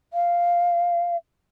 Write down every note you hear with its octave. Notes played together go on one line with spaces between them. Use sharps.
F5